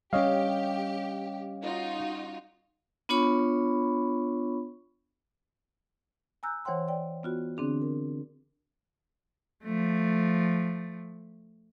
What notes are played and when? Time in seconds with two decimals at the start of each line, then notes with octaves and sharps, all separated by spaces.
0.13 G3 C#4 G4 C#5 D#5 F5
1.62 D#4 F4 F#4
3.09 B3 D4 F4 C#5 B5 C#6
6.43 G#5 A#5 E6 F#6 G6
6.65 E3 C5 C#5 F#5 G5 C6
6.88 D5 G5
7.23 B3 F4 F#4
7.57 D3 C4 D4 G#4
7.82 A#4
9.64 F3 A3